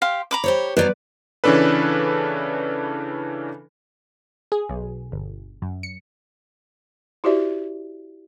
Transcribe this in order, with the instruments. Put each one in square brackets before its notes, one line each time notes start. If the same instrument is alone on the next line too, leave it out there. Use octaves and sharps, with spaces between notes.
[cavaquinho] G4 F5 C6
A#5 B5 D6
[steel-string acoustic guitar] G4 C5 C#5
[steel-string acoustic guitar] G2 F#3 B3 [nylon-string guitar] B4 D5 [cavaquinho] C5
[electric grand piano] C#3 E3 C#4 D4 A4 B4
[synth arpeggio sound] G#4
B1
G1
F#2
C#7
[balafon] E4 F#4 G4 C5 D5 E5